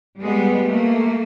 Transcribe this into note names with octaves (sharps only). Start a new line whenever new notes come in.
G3 G#3 B3
A3 A#3